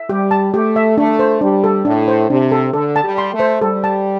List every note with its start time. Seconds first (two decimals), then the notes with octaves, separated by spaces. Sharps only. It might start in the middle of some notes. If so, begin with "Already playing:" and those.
Already playing: E5
0.09 G3 G4
0.31 A5
0.53 A3 G4
0.76 E5
0.97 A3 D4
1.19 C5
1.41 G3 D4
1.64 A4
1.85 A2 D4
2.08 C5
2.29 C3 D4
2.51 A4
2.73 D3 A4
2.96 A5
3.03 G3
3.18 C6
3.33 A3
3.40 C5
3.61 G3 A4
3.84 A5